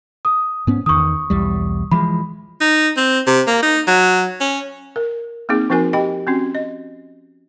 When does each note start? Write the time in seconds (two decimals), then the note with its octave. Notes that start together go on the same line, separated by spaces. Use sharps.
0.25 D#6
0.67 G#2 B3 C#4
0.86 E2 D#3 C#6 D#6
1.30 B1 E2 G3
1.91 E3 F3 G#3 B5
2.61 D#4
2.97 C4
3.27 C3
3.47 A#3
3.62 D#4
3.87 F#3
4.41 C#4
4.96 A#4
5.49 A#3 C4 D#4 G#4
5.70 F3 C4 D#4 F#4 A#4 G#5
5.93 G4 D#5 G5 B5
6.27 C4 C#4 F#4
6.55 D#5